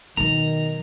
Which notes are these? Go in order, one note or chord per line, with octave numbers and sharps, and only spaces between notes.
B2 D#3 F#3 A#5